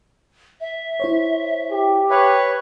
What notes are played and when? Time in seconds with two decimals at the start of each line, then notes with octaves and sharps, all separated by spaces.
0.61 E5
1.00 E4 C5 C#5
1.71 G4
2.11 B4 C#5 E5 F6 F#6